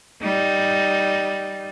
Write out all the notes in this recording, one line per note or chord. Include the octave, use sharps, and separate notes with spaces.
G3 D#4